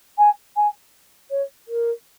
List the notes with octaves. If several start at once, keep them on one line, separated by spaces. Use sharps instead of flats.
G#5
G#5
C#5
A#4